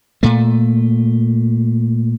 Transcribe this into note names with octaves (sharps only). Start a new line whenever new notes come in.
A#2 A3